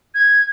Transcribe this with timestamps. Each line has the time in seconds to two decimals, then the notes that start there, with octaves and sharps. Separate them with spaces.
0.14 G#6